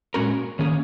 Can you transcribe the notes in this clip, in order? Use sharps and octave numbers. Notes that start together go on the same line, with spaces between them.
A#2 G#3 C#4 F#4 A#4
D#3 A#3 C#4 G#4